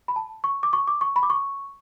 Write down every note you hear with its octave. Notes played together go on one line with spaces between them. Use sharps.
B5
A5
C#6
D6
C#6
D6
C#6
B5
D6
C#6